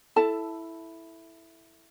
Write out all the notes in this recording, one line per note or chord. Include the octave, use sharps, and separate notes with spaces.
E4 A4 A5